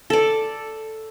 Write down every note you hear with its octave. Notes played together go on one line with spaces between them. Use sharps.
A4 D5